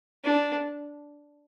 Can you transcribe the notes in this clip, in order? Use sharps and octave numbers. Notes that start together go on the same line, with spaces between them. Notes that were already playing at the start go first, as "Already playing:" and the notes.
D4